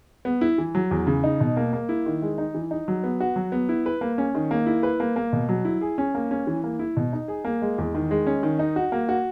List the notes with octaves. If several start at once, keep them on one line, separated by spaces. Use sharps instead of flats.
B3
E4
E3
F#3
E2
C#3
D#4
B2
A#3
A#3
E4
D#3
G#3
D#4
E3
D#4
F#3
B3
F#4
F#3
B3
E4
B4
A#3
C#4
D#3
A#3
E4
B4
A#3
A#3
B2
F#3
E4
G#4
C#4
A#3
C#4
E3
A#3
E4
B2
D#4
G#4
A#3
G#3
E2
D#3
G#3
C#4
D#3
D#4
F#4
A#3
F#4